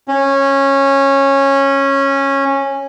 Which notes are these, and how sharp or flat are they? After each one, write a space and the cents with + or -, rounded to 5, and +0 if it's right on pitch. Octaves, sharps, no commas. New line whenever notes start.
C#4 -15